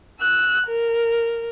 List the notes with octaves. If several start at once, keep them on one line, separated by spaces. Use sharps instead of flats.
E6 F#6
A#4